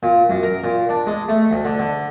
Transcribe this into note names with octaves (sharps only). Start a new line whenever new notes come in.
A#2
F#2
A#4
A#2
D4
G#3
A3
D2
D3
D3